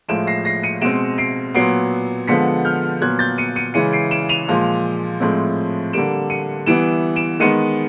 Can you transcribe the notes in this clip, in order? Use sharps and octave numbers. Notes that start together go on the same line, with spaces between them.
A2 F3 G#3 D7 E7
A#6 C7
A#6 C7
C#7 D#7
B2 G#3 C4 D7 E7
C7 D7
A#2 F#3 B3 C7 D7
D3 F3 G#3 B3 B6 C#7
F6 G6
A#2 F#3 B3 F#6 G#6
G6 A6
C#7 D#7
C#7 D#7
C#3 E3 G#3 C#7 D#7
C7 D7
D7 E7
D#7 F7
A#2 F3 G#3
A2 F3 G#3 C4
D3 G3 A#3 D7 E7
C#7 D#7
E3 G3 B3 D7 E7
D7 E7
D#3 G#3 B3 C#7 D#7